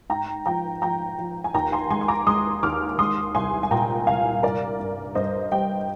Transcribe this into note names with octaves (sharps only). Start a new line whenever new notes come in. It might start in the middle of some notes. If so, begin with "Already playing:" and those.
G#2 G5 A#5
F3 G5 A#5
F3 G5 A#5
F3
G#5
D#2 G5 A#5
G#5 C6
G#3 G#5 C6
C6
A#5 D6
G#3 C6 D#6
D#2 D6 F6
G#3 C6 D#6
C2 G#5 C6
G#5
A#2 G5 A#5
C2 F5 G#5
G2 A#4 D5
G2
G2 C5 D#5
G3 D#5 G5